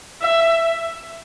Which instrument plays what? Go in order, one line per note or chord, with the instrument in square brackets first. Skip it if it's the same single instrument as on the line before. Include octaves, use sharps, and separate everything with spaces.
[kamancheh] E5